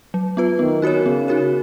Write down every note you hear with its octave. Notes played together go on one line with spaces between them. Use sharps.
F#3
B3 F4 B4
D#3 B3
D#4 F#4 A#4 C#5
C#3 B3
D#4 F#4 A#4 C#5